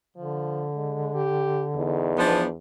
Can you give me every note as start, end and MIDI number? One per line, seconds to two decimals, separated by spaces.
0.17 2.40 50
0.17 0.67 53
0.75 1.14 56
1.14 1.66 67
1.76 2.58 40
1.76 2.47 63
2.18 2.45 53
2.18 2.45 59
2.18 2.45 62